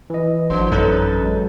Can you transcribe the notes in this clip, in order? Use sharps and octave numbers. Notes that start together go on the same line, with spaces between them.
E3 D#5
A1 F3 D4 C5 C6
F#2 D#4 A4 B4 C#5
F#3 G#3